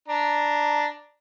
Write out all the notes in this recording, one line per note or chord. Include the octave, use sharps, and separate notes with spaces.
D4 A#5